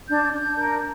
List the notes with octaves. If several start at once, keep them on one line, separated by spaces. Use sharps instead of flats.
D4 G6
D4
A#4